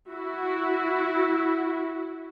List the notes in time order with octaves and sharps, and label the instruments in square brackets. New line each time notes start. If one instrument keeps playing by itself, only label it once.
[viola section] E4 F#4